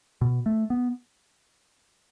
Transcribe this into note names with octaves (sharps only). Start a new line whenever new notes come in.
B2
A3
B3